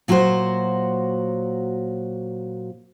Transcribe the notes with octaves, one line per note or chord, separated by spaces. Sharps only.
A#2 F#3 F#4 A4 C5